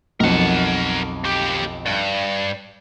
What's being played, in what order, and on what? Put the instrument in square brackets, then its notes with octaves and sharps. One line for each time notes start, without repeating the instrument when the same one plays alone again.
[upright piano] B1 F2 [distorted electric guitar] A#4 F#5
[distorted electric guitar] D#2 G4
G2